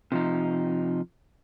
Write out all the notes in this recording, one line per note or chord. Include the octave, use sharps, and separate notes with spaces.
C3 F3 D#4